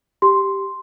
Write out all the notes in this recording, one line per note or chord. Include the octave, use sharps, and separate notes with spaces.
G4 C6